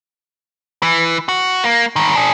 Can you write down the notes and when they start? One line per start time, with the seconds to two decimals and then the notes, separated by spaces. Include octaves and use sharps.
0.83 E3
1.29 F#4
1.64 A#3
1.96 G2 D#3
2.15 D4 G#4